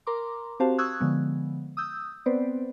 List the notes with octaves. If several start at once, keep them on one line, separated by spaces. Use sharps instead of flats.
A#4 A#5 C6 D6
C4 F#4 G4 C5 F5 A5
C#6 D#6 E6 F#6 G#6
D3 F3 G#3 B3
D#6 E6 G6
B3 C4 B4 C5 D5